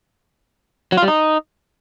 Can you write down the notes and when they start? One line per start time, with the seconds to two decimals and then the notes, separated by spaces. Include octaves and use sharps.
0.92 F#3
0.97 F4
1.03 G3
1.08 D#4